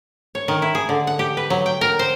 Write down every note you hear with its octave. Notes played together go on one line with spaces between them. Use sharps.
C#5
D#3
E4
G#4
D3
F#5
G4
B4
F#3
G5
A#4
C5